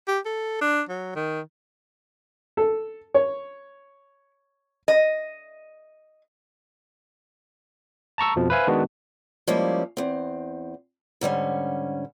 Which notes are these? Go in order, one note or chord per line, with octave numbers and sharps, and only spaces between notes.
G4
A4
D4
F#3
D#3
A4
C#5
D#5
A5 A#5 C#6 E6
F2 B2 F3
B4 C5 E5 F5 G#5
D#3 G#3 B3 D4 F#4
F3 G3 G#3 A#3 C#4 E4
E2 C4
G#2 D3 G3 C#4